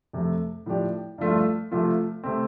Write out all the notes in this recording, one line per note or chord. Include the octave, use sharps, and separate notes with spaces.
F2 C3 A3
A2 F3 D4 G4
G2 F3 A3 F4
C3 F3 A3 F4
C3 A3 C4